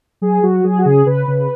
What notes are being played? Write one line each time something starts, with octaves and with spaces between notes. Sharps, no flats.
F#3 G#4
F#3 F#4
F#3 G#4
F#4
C#3 G#4
C#3 B4
C#3